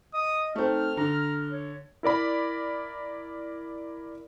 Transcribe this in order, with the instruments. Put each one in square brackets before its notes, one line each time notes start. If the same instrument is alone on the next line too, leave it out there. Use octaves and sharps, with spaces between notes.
[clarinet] D#5 [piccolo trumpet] D#6
[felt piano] A3 C4 [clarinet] D#4 [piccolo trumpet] F6
[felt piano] D3 [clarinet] A#5
[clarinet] C#5
[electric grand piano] E4 A#4 D5 B5